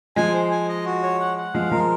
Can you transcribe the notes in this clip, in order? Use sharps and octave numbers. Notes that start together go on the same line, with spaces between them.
F3 G#3 G#5
C5
G#5
D#5
F#4
C#5
F#5
F#5
F3 G#3 F5
F3 G#3 A#4